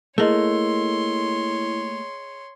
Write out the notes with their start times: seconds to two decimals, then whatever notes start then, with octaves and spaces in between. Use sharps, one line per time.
0.18 A3 A#3 E4 G#4 C#5 D#5 C6